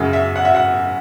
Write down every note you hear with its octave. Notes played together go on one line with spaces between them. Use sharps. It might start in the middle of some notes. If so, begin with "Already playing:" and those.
Already playing: F#2 C#3 F#3
E5
F#5
E5
F#5